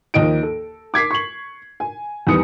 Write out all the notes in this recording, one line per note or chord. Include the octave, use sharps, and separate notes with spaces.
D#2 F3 A#3 D#5 D7
A4
D6 G#6 B6 C7
C#6 F#7
G#5
E2 D#3 G3 B4 D#6 C#7